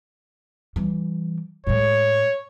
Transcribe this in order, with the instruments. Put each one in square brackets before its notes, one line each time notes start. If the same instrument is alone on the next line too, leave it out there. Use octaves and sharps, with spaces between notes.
[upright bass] E3 G3
[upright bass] A2 G#3 [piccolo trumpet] C#5